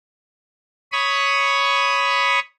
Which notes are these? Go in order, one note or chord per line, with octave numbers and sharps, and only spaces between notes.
C#5 B5 C#6 D#6